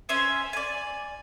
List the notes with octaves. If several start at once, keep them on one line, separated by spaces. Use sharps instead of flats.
C#4 C5 E5 G#5
D5 G#5